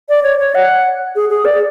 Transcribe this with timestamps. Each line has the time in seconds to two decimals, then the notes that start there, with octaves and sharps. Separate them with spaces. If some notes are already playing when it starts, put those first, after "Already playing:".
0.09 D5
0.23 C#5
0.39 C#5
0.55 F#5
1.16 G#4
1.30 G#4
1.45 D5